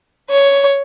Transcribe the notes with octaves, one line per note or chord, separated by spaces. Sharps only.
C#5